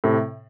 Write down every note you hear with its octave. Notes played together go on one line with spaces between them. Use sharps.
A2 C3